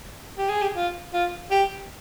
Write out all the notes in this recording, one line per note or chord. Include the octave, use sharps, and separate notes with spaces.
G4
G#4
G4
F4
F4
G4